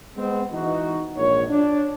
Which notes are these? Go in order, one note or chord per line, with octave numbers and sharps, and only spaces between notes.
G#3 B3 C4
E3 D#4 F#4
A#1 G#2 A#3 C#5
D4